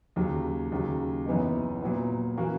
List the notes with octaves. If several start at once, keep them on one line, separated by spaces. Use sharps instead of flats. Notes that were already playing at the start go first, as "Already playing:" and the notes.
D#2 C#3 F#3
D#2 C#3 F#3
F#1 F#2 E3 B3 D#4
A#2 F#3 B3
E3 A#3 C#4 F#4